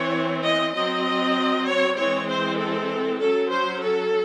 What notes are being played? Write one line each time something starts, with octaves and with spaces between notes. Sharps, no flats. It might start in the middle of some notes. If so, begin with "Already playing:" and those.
Already playing: E3 C4 C#5
D#5
F#3 C4 D#5
C#5
E3 G#3 C4 C#5
C5
A4
F#3 C#4 A4
C5
A4